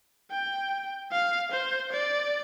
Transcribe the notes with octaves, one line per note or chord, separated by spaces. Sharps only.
G5
F5
C5
D5